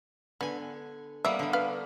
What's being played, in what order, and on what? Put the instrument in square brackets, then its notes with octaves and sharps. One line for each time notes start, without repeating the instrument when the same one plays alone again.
[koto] D3 G#5 [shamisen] B3
[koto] G3 A#3 B3 [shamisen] E5
[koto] D3 G3
[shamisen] B4 F5